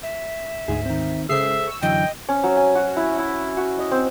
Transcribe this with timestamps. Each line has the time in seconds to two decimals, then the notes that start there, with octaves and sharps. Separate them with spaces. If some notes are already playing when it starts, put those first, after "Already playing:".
0.03 E5
0.68 D2 G#2 G#4
0.86 D#3 C4
1.29 C#3 G#3 G#4 A4 C5 E5 C7
1.67 C#6 E6
1.82 F#2 D3 E3 D#5 G5
2.29 C#4
2.44 F#3
2.57 G#5
2.75 F#4
2.96 E4
3.18 E4
3.57 F#4
3.79 D#5
3.91 C4